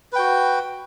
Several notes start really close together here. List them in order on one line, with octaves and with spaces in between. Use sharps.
B4 G5 F#4